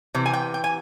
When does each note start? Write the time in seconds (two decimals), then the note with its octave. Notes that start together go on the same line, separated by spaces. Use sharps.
0.14 C3 E3
0.26 G#5
0.33 G5
0.54 G5
0.64 G#5